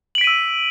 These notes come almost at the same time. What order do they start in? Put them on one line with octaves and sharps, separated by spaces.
F#7 D7 B6 D#7 E6